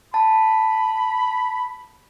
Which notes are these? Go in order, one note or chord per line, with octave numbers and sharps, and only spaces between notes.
A5 B5